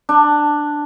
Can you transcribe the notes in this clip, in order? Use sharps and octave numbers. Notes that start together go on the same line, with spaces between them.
D4